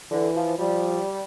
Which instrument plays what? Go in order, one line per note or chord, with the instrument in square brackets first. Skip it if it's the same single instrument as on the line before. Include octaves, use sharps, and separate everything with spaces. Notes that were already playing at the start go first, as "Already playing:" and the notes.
[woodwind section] D3 [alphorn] E3
[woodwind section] F3
[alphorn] F3 [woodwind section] G3